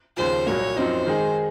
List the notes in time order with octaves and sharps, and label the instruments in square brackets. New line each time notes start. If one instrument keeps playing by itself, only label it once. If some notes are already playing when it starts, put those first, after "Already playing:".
[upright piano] D#2 C#3 F3 [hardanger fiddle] C5
[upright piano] C2 A#2 F#3 A#3 [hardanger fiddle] C#5
[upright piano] F#2 F3 C4 D#4 [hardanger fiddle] C5
[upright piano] D#3 G#3 D#4 G#4